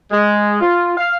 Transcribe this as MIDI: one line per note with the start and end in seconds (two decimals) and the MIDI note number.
0.11 0.59 56
0.61 0.92 65
0.97 1.17 77